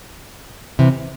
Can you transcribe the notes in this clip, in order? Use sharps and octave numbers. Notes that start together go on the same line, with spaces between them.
C3 E3